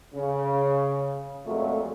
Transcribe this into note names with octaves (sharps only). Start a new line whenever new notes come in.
C#3
F2 A#2 F#3 G#3 A3